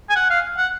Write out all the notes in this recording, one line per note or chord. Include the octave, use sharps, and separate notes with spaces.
G#5
F#5
F5
F#5